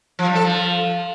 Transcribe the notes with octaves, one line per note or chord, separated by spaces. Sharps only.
F3
G3
A4
F3